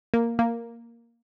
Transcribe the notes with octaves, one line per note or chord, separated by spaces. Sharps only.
A#3
A#3